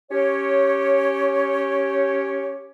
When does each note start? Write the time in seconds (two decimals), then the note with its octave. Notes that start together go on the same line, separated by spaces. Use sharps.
0.11 C#4 G4 C#5